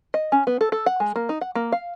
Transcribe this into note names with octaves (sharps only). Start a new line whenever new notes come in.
D#5
C#4
B3
A4
A4
F#5
G#3
A#3
D#4
F#5
A#3
F5